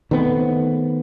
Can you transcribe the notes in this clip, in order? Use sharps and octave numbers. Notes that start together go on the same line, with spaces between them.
D#3 A3 B3 C4